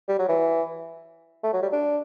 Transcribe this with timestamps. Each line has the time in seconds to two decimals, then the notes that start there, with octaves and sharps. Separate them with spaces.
0.08 G3
0.19 F#3
0.29 E3
1.44 A3
1.53 F#3
1.62 G3
1.72 D4